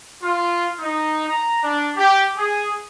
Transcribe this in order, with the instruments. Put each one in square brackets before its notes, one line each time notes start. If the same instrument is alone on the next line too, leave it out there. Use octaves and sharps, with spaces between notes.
[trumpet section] F4
D#4
A#5
D4
G4
G#4